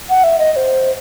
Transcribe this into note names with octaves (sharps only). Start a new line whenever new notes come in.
F#5
E5
D#5
D#5
C5